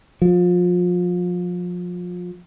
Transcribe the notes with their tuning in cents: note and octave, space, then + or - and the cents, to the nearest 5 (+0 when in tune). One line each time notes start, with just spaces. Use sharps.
F3 +30